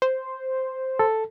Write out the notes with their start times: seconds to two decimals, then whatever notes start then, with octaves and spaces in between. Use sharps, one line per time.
0.02 C5
0.99 A4